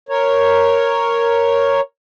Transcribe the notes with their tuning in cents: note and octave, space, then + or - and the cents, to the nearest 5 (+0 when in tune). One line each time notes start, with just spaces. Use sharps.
A#4 +0 C#5 +0